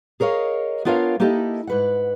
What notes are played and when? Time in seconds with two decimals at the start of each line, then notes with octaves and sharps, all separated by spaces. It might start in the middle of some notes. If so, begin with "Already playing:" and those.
0.20 G#4 A#4 C#5 D#5 F5
0.85 B3 D4 F4 A#4 C#5 F5
1.20 A#3 D#4 E4 G4 A4 D#5
1.67 G#2 B4 F#5